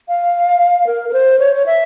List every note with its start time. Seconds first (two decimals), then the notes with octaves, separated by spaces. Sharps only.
0.08 F5
0.87 A#4
1.09 A#4
1.13 C5
1.39 C#5
1.55 C#5
1.66 E5